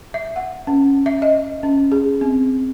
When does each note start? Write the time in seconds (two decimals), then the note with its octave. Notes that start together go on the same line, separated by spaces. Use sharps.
0.14 E5
0.36 F#5
0.67 C#4
1.06 E5
1.22 D#5
1.63 C#4
1.92 G#4
2.21 C4